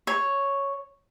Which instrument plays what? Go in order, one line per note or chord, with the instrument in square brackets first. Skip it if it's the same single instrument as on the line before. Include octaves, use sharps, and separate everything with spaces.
[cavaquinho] C#5